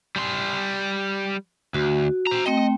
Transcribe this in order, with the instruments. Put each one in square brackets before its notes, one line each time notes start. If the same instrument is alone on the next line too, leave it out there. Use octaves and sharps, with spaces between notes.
[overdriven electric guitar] G3 C6
[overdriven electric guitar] D2 [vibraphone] F#4
[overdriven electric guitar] C5 A#5
[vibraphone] A3 C4 G5 [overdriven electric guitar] D#5